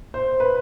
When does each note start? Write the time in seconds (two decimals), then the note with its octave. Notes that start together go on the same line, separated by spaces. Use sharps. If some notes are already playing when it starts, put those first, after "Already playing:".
0.14 C5
0.40 B4